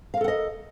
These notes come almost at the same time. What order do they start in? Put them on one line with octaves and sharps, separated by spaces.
F5 A#4 A4 F#5 D#5